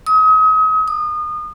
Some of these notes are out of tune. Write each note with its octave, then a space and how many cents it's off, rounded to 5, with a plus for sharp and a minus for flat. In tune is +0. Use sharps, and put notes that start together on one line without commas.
D#6 +35
D#6 -30